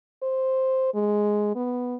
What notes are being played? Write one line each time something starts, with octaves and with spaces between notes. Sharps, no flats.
C5
G#3
B3